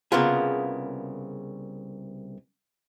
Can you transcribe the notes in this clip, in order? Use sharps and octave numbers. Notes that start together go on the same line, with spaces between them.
C2 C#3 A#3 B3 F4 G#4